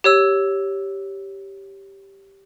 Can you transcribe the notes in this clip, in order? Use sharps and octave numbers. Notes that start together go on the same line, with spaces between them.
G4 C#5 E6